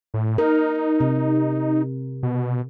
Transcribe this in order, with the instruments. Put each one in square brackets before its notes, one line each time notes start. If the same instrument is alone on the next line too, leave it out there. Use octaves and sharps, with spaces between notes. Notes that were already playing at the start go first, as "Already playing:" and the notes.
[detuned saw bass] A2
[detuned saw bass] D#4 [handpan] A#4
[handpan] C3
[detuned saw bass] B2